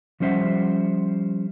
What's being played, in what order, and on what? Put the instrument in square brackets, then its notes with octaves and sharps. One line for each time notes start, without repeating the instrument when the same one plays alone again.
[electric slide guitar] F3 G3 C#4 C5 E5 F#5